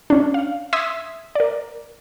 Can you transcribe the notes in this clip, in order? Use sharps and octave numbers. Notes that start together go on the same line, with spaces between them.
C#4 D4
F5
E5 C6 D#6 E6 G#6 B6
A#4 D5